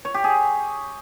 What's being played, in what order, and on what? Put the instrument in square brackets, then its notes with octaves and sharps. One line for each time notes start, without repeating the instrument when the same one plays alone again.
[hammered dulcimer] C#5
G4
G#4